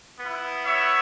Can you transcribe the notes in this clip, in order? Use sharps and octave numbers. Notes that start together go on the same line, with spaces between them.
B3 E4
C#5 E5